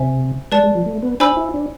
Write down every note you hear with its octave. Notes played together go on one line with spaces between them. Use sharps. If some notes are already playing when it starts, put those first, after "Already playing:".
Already playing: C3 C5 E5 G#5
G#3 B4 D5 A5
G#3
F3
A3
B3
D4 C5 G#5 B5 E6
E4
D4